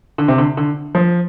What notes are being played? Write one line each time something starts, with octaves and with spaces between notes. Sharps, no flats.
D3
C3
D3
D3
F3